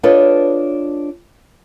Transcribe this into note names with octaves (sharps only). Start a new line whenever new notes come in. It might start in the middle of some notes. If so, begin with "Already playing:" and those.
D4 F4 A4 B4 C#5 D#5